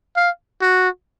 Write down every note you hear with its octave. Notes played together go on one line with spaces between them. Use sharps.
F5
F#4